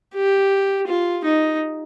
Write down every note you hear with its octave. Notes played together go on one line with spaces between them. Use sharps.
G4
F4
D#4